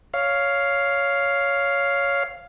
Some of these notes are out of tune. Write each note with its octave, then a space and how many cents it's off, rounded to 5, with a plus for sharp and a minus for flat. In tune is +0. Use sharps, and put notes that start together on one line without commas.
C#5 +10 F5 +0